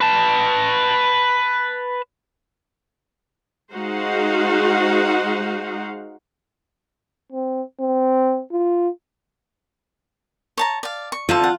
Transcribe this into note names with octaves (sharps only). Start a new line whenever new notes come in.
B4 A5
G#3 D#4 F#4 C5 F5 F#5
C4
C4
F4
C#5 A5 A#5
D5 F5
C#6
D3 C4 F4 A5
F#5